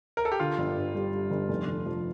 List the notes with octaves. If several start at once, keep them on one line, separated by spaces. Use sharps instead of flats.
A#4
A4
G4
D3 F4
G1
G2
G3
G3
G1
F1
F1
F3